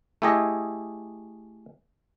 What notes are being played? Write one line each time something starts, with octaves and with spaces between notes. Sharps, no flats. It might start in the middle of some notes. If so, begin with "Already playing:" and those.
A3 E4 G4 G#4 D#5